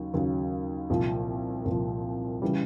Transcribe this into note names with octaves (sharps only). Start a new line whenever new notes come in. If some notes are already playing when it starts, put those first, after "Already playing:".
Already playing: D#2 C#3 F#3
D#2 C#3 F#3
C2 A#2 F3
C2 A#2 F3
C#3 E3 G3